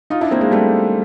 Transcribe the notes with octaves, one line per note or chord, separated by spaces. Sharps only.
D#4 F4
D4 E4
A#3 C4
G#3 A#3
G3 A3